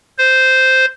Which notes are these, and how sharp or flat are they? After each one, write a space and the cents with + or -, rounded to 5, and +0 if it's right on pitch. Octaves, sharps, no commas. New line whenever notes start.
C5 -5